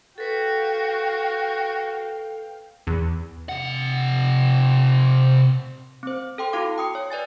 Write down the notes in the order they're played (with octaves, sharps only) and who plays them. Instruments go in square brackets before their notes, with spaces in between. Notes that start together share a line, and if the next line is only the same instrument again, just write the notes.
[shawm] F#4 [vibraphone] A4 B4 [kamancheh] F5 G5
[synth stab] E2
[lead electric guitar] C3 F#5
[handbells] C4 C5
A4 G5 C6
E4 F#4 F5 D6
G5 D#6 C#7
C#5
B4 D5 G#5 A6